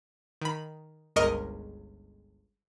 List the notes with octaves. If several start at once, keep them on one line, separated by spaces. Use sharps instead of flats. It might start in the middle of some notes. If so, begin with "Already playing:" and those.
D#3 B5
G1 C#2 A#4 D#5 C#6